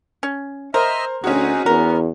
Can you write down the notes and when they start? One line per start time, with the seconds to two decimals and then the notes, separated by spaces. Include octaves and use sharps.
0.23 C#4
0.74 A#4 C5 D#5 E5 F6
1.24 D2 C4 C#4 D#4 F#4 G#4
1.66 E2 B3 A#4